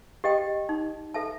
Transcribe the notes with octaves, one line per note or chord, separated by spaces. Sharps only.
G4 D#5 G5
D#4
A4 E5 A5